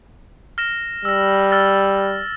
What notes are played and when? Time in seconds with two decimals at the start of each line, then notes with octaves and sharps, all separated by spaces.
0.58 F6 A#6 E7
1.05 G3 E6 A#6
1.52 E6 F6 A6